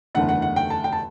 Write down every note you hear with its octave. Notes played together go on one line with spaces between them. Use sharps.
F#1 E2 D3 A3 F#5
F#5
F#5
G5
A5
G5
A5